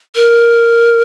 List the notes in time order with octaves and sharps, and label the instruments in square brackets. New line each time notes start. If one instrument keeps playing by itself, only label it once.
[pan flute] A#4